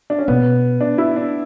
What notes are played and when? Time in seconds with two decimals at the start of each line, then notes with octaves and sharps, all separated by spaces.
0.10 D4
0.19 C#4
0.28 B2 B3
0.81 D4
0.98 E4
1.16 D4